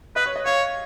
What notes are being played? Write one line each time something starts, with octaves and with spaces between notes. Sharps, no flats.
B4 D#5
C#5
D#5
C#5 F5